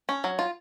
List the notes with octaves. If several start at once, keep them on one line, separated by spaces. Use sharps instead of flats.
C#4
F#3
F4